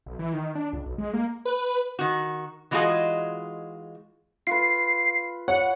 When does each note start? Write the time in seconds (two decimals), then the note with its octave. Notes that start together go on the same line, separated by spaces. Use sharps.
0.06 B1
0.19 E3
0.33 D#3
0.55 D4
0.73 C#2
0.86 B1
0.98 G#3
1.13 A#3
1.45 B4
1.99 D#3 F#4
2.71 E3 G#3 F4 F#4 G#4 D#5
4.47 F4 B4 C7
5.48 C#5 F#5